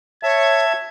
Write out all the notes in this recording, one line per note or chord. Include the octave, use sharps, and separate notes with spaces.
C#5 E5 A5 G#6